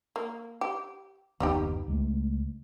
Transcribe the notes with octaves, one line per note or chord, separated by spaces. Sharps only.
A#3
G4
F#1 D#2 G3 B3 D#4 G4
C#2 G#3 A3